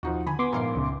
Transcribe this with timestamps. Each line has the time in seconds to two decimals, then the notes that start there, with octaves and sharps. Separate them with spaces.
0.03 D#2 F3 D#4 F#4
0.27 D3 D#3 G#5 B5
0.39 B3 C6 D6
0.53 A#1 G#2 A#4 F5 C7
0.75 C#2 C#3